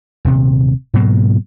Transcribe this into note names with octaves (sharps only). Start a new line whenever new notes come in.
D#1 C3
G#2 B2 F#3 A#3